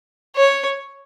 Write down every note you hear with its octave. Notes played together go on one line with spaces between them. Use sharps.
C#5